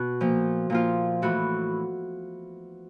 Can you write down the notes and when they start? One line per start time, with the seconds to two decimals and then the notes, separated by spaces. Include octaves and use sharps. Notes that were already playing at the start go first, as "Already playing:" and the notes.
Already playing: B2 F#4
0.21 A#2 F3
0.70 A#2 F3 F4
1.22 A2 E3 F#4